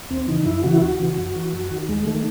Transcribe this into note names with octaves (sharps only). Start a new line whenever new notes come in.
D#2 C4
C#3 E3 D#4
F#2 E4
C#3 E3 F#4
E4
D#2 F#4
C#3 E3
F#2
E3
F#2
D#3
D#2 G#3
D#3 A3